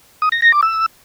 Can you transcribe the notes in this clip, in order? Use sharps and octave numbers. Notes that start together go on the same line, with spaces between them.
D#6
A#6
A#6
D6
E6